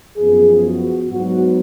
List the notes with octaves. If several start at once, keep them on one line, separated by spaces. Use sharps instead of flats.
F#2 F3 B3 G#4
F#4
G#2 F#3 B3 F#4